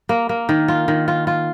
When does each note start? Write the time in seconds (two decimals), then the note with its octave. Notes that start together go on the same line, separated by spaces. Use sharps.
0.09 A#3
0.29 A#3
0.49 D#3
0.68 F4
0.88 D#3
1.08 F4
1.27 F4